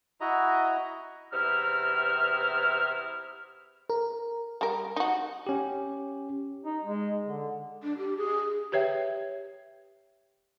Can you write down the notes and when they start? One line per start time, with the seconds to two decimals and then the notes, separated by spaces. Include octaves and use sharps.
0.21 E4 F#4 D#5 A#5
1.32 E2 C3 D#4 E4 F6
3.90 A#4
4.61 G3 A#4
4.96 D#4 F#4
5.47 C#4 G4
6.65 D#4
6.85 G#3
7.26 D3
7.83 D4
7.98 G4
8.17 G#4
8.72 G4 B4 C#5 E5 G5